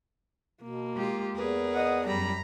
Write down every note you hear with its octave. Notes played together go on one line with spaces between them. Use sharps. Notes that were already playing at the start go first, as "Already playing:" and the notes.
B2 A#3
G#3 F4 G4
E2 G#4 A#4 B4
D#5 F#5
F#2 G3 A#5 B5